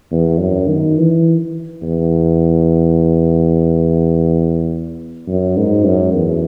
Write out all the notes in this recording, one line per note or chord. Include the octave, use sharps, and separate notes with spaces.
E2
F#2
D#3
E3
E2
F#2
G#2
F#2
E2